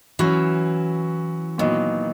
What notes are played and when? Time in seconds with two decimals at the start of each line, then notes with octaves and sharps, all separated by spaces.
0.19 E3 F#3 C#4 F#4
1.58 A#2 D#3 F#3 B3 D#4